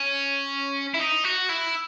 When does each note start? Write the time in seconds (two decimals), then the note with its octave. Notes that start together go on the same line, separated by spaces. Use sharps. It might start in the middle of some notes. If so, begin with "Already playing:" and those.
Already playing: C#4
0.94 E4
1.01 D#4
1.24 F#4
1.49 E4